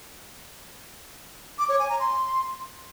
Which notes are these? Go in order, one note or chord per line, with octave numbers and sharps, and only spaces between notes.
D6
C#5
G#5
A#5
C6